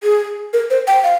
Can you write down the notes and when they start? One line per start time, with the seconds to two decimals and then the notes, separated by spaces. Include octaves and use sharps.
0.03 G#4
0.53 A#4
0.70 C5
0.87 G5
1.04 F5